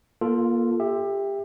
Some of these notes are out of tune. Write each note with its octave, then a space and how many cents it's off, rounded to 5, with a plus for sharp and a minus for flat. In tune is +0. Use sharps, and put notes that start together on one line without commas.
A#3 +30 F4 +0 A4 +0
G4 +25 E5 +0